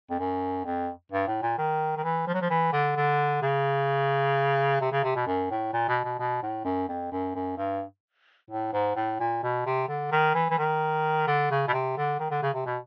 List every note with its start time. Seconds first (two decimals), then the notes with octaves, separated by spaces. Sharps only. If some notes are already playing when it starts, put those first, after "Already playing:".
0.10 F2
0.19 F#2
0.65 F2
1.12 G2
1.27 A2
1.42 A#2
1.58 D#3
1.97 D#3
2.03 E3
2.27 F3
2.34 F#3
2.42 F3
2.50 E3
2.73 D3
2.96 D3
3.42 C#3
4.81 C3
4.92 C#3
5.04 C3
5.16 B2
5.27 F#2
5.51 A2
5.73 A#2
5.89 B2
6.04 B2
6.19 B2
6.42 A2
6.65 F#2
6.89 F2
7.12 F#2
7.35 F#2
7.57 G2
8.50 A2
8.73 G#2
8.96 A2
9.20 A#2
9.43 B2
9.66 C3
9.88 D3
10.12 D#3
10.34 E3
10.50 E3
10.58 D#3
11.27 D3
11.51 C#3
11.68 B2
11.73 C3
11.97 D3
12.19 D#3
12.31 D3
12.42 C#3
12.54 C3
12.66 B2